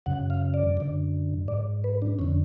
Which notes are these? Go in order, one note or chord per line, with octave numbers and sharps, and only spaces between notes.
F#2 C#3 F#5
F5
D5
F#2 D3
G#2 D5
B4
D4
F2 D3 C#4